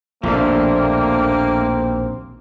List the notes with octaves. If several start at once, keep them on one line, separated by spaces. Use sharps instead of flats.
A#1 D#2 B2 F3 A3 A#3 C4 D4